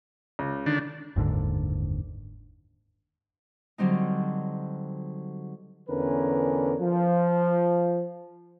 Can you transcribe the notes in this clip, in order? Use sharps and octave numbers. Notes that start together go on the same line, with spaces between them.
C#2
D3 D#3 D4
F#1 D#2 G#2 D3
D3 F#3 G3 C4 D#4
E2 D3 C#4 A#4 B4
F3